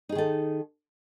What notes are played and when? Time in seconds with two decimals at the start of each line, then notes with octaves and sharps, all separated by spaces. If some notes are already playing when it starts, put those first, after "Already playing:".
0.09 D#4
0.12 G#4
0.15 D#3
0.18 A4